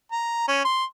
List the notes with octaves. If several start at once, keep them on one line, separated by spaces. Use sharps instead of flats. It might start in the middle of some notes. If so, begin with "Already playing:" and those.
A#5
C#4
C6